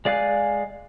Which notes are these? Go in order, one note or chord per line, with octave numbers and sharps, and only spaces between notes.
G#3 D5 F5 G#5 F#6